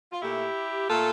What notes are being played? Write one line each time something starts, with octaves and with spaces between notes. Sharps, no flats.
F4
A#2 A3 E4 G4
A#2 A3 F4 A4